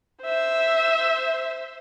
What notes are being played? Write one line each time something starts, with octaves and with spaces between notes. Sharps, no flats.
C5 E5